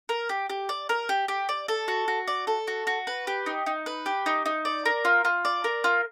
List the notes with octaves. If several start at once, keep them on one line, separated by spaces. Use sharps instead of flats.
A#4
G4
G4
D5
A#4
G4
G4
D5
A4
F#4
F#4
D5
A4
F#4
F#4
B4
G4
D#4
D#4
B4
G4
D#4
D#4
D5
A#4
F4
F4
D5
A#4
F4